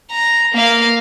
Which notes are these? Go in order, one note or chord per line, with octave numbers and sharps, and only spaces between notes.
A#5
A#3 F5